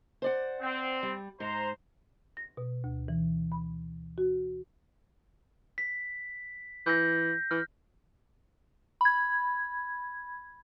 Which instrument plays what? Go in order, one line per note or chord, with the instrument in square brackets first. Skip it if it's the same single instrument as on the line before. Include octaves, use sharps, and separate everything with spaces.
[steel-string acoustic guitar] C5 D5 F#5
[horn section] C4
[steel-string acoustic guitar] G3
[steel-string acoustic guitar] G#2 [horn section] C5 A#5
[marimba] A#6
B2
D2
E3
B5
F#4
[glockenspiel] B6
[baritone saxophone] E3 [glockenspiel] G6 A#6
[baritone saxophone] E3 [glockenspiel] F6
[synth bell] B5 G#6